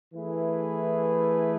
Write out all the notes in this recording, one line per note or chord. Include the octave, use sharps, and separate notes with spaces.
E3 A3 E4 G#4 B4